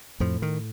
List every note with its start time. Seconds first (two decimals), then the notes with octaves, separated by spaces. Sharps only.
0.20 F2 A2 F3
0.42 D#3